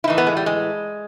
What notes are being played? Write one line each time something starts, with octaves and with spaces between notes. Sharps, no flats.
E4
A2 E3 D#4
B3
G#3
G3
G#3